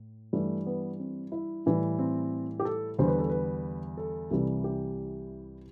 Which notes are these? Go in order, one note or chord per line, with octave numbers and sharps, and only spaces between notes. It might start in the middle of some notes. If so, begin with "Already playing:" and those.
Already playing: A2
G2 E3 G3 A3
B3
C4
E4
A2 E3 G3
C4
G4
A4
E2 D3 G3 C5
B4
A4
B4
A4
C2 C3 E3 G3
G4